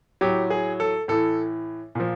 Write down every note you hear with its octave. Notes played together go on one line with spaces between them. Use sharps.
A2 F#3 G4
G#4
A4
A2 E3 A4
A#2 F3